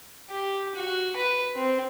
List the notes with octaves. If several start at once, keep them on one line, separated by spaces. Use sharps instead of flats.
G4
F#4
B4
C4